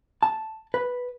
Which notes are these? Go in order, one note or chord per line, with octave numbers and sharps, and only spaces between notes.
A5
B4